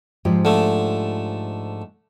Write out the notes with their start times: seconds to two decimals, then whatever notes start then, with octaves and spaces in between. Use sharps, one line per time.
0.25 G#2 F3 G4
0.45 D3 A3